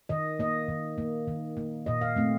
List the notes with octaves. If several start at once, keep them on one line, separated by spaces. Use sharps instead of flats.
D#3 D#5
A#3 D#5
D#3
A#3
D#3
A#3
A#2 D#5
F5
A3 C4